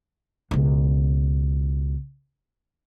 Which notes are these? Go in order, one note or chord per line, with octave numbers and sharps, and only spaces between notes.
C#2 B2